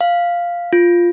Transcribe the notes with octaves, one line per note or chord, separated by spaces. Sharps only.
F5
F4